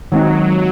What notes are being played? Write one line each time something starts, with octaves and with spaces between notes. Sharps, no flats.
D#3 F#3 G#3 C4 D#4